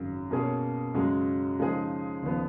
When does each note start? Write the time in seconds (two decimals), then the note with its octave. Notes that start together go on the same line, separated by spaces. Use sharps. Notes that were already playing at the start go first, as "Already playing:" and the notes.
Already playing: G#1 F#2 C#3
0.30 B2 A#3 C#4 G#4 C#5
0.94 F#2 C#3 G#3 C#4 F#4
1.59 C#3 F3 G#3 D#4 G#4
2.22 F1 D#2 C#3 F3 B3